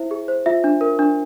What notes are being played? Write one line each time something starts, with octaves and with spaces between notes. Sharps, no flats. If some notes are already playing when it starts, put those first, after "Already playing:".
Already playing: E4 C5 E5
G#4
C5
F4 E5
D4
A#4
D4